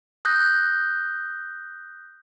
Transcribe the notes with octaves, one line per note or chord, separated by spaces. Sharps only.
D#6 F#6 G6 A#6